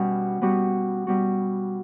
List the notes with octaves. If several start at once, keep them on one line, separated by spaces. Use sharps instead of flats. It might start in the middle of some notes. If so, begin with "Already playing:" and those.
Already playing: B2 G3 C#4
B2 G3 B3 F#4
B2 G3 B3 F#4